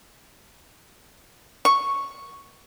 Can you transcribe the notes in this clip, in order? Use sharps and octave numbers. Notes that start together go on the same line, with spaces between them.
C#6